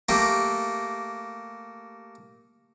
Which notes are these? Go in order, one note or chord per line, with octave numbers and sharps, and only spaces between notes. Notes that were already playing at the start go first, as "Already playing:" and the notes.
A3 A#3 G4